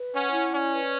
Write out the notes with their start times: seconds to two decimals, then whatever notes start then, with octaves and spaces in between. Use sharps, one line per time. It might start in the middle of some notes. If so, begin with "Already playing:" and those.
Already playing: B4
0.12 C#4 F#5
0.32 E4
0.52 C#4 D5
0.72 B4